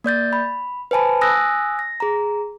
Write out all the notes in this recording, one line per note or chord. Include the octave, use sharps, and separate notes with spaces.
A#3 D5 G6 A6
B5
B4 C5 G#5 A5 B5
G#5 D#6 E6 F#6 A#6
A#6
G#4 A#5